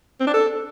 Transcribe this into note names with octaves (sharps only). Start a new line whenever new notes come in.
C4
D4
A4